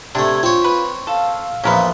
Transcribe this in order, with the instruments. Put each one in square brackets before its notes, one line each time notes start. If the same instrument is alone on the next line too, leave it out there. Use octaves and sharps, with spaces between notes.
[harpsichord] C3 A3 [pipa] D4 [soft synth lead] G#6
[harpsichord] C4 C#5 [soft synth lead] F4
[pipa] B4
[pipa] A4 [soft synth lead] F5
[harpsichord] A#1 E2 F3 [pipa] C#4 A#4 B4